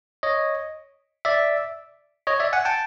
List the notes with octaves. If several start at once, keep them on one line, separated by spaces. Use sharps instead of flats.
C#5 D#5
D5 E5
C#5 D#5
D5 E5
F#5 G#5
G5 A5